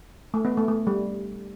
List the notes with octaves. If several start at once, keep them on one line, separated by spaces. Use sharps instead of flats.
A3
B3
A3
A3
G3